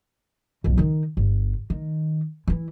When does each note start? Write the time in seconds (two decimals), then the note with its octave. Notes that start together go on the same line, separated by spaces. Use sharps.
0.64 B1 F2
0.78 D#3 D#4
1.17 G1
1.70 D#3
2.47 E3 E4